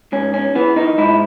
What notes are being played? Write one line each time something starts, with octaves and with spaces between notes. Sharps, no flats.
G#2 C#4
C#4
E3 B3
D#4
G#2 E4